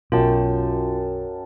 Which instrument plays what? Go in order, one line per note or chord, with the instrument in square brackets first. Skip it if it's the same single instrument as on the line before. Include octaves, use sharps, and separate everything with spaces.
[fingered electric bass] B1 B2 [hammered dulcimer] F#2 G5 A5 [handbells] F4